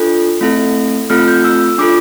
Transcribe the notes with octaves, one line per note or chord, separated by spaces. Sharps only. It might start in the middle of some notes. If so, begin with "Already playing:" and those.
Already playing: D4 F4 A4
A3 C4 E4 A4
A3 C4 F4 A4 F6
G6
E6
D4 F4 A4 D6